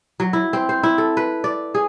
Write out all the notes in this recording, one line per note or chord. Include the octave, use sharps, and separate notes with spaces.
F#3
E4
C4
C5
E4
A4
B4
D5
G#4